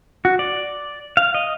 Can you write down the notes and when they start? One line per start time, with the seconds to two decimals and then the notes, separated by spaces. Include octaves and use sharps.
0.25 F#4
0.39 D5
1.17 F5
1.34 D#5